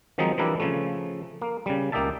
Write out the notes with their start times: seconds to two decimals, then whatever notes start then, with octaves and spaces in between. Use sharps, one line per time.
0.18 D#3 F3 F#3 G#3 C4 D#4
0.38 E3 F3 G3 A#3 D4 E4
0.60 C#3 F3 A3
1.42 A#3
1.66 C#3 G3
1.92 C#2 A#3 D#4 G4 E5 A5